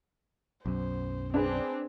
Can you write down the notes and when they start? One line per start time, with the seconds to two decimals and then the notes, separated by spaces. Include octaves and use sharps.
0.66 B1 F#2 C5
1.34 C4 D4 G#4 B4